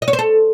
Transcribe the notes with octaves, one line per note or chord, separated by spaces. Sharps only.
D#5
C#5
C5
A4